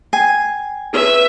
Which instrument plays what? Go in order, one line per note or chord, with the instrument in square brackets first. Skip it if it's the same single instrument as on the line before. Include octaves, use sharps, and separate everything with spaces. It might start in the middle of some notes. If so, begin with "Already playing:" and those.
[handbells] G5 [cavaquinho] G#5
[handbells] G#4 [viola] B4 E5